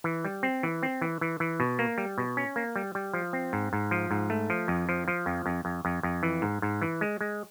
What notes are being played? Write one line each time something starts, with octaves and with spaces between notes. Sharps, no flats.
E3
G3
C4
E3
C4
E3
E3
E3
B2
A#3
G3
B2
C#4
A#3
G3
G3
F3
C4
G#2
G#2
F3
G#2
A3
F3
F2
F3
F3
F2
F2
F2
F2
F2
E3
G#2
G#2
E3
G#3
G#3